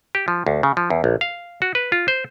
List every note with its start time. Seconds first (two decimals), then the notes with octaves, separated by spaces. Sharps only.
0.15 G4
0.28 F3
0.47 D2
0.63 C#3
0.77 F3
0.90 E2
1.04 A#1
1.21 F5
1.62 F#4
1.75 B4
1.92 F4
2.08 C5